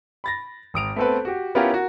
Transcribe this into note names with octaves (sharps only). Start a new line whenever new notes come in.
B5 A6 A#6
G#1 D#6 D7 F7
A3 B3 C4 A4 B4
F#4 G4
B3 C#4 E4 F4 G4 A#4
F#4 A#4